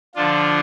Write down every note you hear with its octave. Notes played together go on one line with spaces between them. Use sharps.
D3 F3 D4 F4